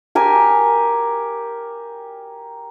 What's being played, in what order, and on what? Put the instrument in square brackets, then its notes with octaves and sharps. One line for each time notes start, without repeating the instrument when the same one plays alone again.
[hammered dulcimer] G4 A#4 G#5